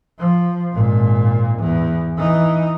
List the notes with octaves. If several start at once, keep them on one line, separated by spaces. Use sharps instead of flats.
F3
G#1 A#2
E2
E3 D#4